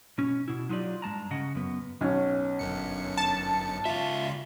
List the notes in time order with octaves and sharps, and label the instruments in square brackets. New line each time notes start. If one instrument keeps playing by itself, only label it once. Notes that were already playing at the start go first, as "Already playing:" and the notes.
[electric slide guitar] B2 C#4
B2 E4
F#3 D#4 F4 G4 D5
G2 G#3 A5 A#5
C#3 D#5 F#5
F#2 B3
[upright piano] B1 C#4
[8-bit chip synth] G1 F#2 C#7
[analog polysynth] A5
[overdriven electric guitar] C#2 E5 [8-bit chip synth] F4